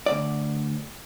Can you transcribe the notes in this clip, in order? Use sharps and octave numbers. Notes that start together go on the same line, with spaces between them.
D2 G2 D5